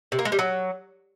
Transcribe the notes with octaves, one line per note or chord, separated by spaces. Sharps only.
C3
A#3
G#3
G3
F#3